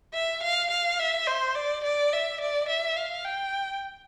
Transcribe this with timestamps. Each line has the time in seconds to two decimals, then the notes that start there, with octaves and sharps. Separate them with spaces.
0.14 E5
0.43 F5
0.71 F5
0.99 E5
1.27 C5
1.56 D5
1.84 D5
2.13 E5
2.41 D5
2.69 E5
2.97 F5
3.25 G5